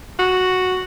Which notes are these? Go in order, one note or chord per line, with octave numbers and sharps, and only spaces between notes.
F#4